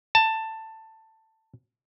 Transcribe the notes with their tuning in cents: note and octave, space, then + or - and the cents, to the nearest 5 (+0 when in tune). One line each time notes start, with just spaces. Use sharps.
A5 +15